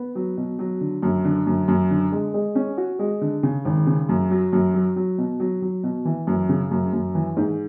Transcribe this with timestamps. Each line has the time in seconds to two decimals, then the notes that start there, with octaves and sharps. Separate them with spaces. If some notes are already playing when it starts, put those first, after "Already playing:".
Already playing: B3
0.15 F#3
0.37 B2
0.59 F#3
0.81 D3
1.03 F#2
1.25 D3
1.47 F#2
1.68 F#2
1.91 D3
2.12 G#3
2.34 G#3
2.55 C#4
2.77 F#4
2.99 G#3
3.21 D3
3.43 C#3
3.65 G#1
3.87 C#3
4.09 F#2
4.31 F#3
4.53 F#2
4.74 F#3
4.96 F#3
5.18 B2
5.40 F#3
5.62 F#3
5.83 B2
6.05 E3
6.27 F#2
6.49 C#3
6.71 F#2
6.93 F#2
7.15 E3
7.37 G#2